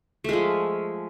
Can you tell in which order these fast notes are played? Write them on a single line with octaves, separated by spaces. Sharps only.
A3 G#3 F3